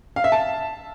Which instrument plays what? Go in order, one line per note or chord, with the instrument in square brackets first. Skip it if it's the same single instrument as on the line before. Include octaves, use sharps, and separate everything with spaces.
[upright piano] F5
E5
A5